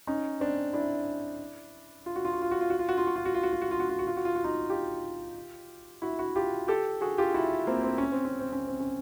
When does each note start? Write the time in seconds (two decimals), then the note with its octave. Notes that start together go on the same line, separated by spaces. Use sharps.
0.07 C#4 D#4
0.40 C4 D4
0.73 D4 E4
2.06 F4
2.16 F#4
2.25 F4
2.33 F#4
2.42 F4
2.51 F#4
2.61 F4
2.70 F#4
2.79 F4
2.89 F#4
2.98 F4
3.07 F#4
3.16 F4
3.26 F#4
3.35 F4
3.43 F#4
3.52 F4
3.62 F#4
3.71 F4
3.80 F#4
3.89 F4
3.99 F#4
4.07 F4
4.17 F#4
4.25 F4
4.35 F#4
4.44 D#4 F4
4.70 F4 G4
6.02 E4 F#4
6.19 E4 F#4
6.36 F4 G4
6.68 G4 A4
7.01 F#4 G#4
7.18 F4 G4
7.34 E4 F#4
7.67 A#3 C4
7.83 C4
7.98 C#4
8.12 C4
8.25 C#4
8.39 C4
8.53 C#4
8.67 C4
8.80 C#4